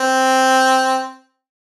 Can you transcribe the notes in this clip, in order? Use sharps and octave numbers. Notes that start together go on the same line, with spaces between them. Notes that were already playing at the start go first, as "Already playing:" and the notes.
Already playing: C4